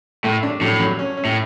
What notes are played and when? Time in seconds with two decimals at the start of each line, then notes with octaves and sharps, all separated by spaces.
0.24 A2 A3
0.43 D4
0.61 A2 F#3
0.80 F#3
0.99 C#4
1.17 C#4
1.25 A2